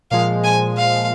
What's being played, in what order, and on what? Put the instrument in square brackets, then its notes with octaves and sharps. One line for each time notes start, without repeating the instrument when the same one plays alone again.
[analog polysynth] A#2 F3 G#3 [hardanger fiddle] F5
[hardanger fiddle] G#5
F5